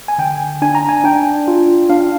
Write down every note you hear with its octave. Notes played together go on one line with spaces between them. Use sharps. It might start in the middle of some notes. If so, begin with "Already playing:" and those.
G#5
D3 G5
D4 G#5
A#5
G#5
D4 G5
F4
D4 F5